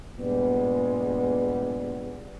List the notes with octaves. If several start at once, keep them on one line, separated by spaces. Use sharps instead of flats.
G2 A#2 G3 G#3 B3